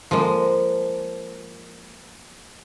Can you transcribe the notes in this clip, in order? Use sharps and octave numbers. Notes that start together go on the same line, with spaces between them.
F3 G#3 A#3